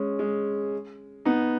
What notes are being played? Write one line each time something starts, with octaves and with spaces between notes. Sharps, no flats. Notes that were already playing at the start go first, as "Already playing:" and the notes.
Already playing: G#3 C#4
G#3 C#4
B3 D#4